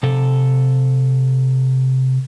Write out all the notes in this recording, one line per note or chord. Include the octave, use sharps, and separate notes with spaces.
C3 A4